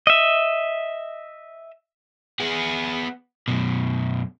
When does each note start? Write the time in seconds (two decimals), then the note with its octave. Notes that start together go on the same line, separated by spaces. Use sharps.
0.07 D#5 E5
2.40 B3 G#4
3.48 F#2 B2